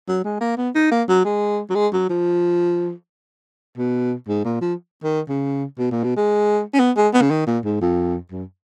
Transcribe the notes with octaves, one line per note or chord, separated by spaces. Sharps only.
F#3
G#3
A#3
B3
D#4
A#3
F#3
G#3
F#3
G#3
F#3
F3
B2
G#2
A#2
F3
D#3
C#3
B2
A#2
B2
G#3
C#4
B3
G#3
B3
C#3
D#3
A#2
G#2
F2
F#2